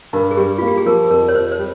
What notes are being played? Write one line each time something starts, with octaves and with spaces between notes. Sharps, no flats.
G2 A#4
G#4
G3 G4
A#3 F4
G4
G#4
F3 A#4
F2 A#4
C#5
F2 C5
C5
G3